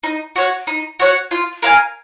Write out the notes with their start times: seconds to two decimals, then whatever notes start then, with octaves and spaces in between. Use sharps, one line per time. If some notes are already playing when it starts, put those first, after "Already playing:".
0.03 D#4
0.36 F#4 C#5 F#5
0.67 D#4
0.99 F#4 C#5 F#5
1.31 F4
1.62 A#4 F5 G#5